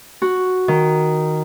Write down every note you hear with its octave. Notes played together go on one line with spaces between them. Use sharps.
F#4
D#3